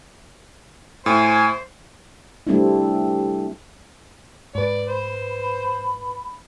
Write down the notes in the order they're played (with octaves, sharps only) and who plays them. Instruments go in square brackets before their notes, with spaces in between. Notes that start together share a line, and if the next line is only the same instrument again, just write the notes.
[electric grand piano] A2 [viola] C5 [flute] G#5
[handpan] G3 A3 C4 D4 E4
[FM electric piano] G#2 B4 [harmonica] D5
[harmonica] C5 [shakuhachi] B5